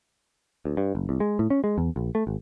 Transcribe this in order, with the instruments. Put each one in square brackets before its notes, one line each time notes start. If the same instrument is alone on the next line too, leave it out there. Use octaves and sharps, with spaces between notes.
[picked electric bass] D2
G2
F#1
C2
G#3
A2
C#4
G#3
E2
A#1
A3
G#1